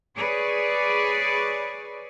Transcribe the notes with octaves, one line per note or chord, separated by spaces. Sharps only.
G#4 B4 C#5 D5